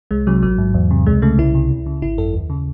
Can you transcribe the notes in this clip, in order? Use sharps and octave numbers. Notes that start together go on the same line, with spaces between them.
C2 G#3
C3 F#3
A1 F#3
G#2
E2
C3
C#2 G#3
C#3 A3
C2 E4
C3
C#2
C#3
G#1 E4
F#2 A4
D#2
C#3